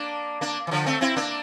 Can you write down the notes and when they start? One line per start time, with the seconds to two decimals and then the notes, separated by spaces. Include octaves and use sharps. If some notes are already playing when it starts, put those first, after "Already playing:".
Already playing: A#3 D4
0.41 A#3 D4
0.67 E3
0.71 D3 F3
0.86 A3 C4
1.01 C4 E4
1.16 A#3 D4